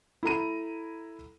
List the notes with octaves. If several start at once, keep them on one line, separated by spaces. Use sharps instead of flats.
E4 A4 A#5 D#7